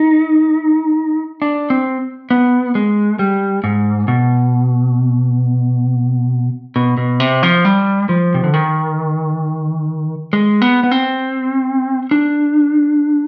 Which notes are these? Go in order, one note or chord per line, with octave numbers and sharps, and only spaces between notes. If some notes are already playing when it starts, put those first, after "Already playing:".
Already playing: D#4
D4
C4
B3
G#3
G3
G#2
B2
B2
B2
C3
F3
G3
F3
C3
D3
D#3
G#3
B3
B3
C4
D4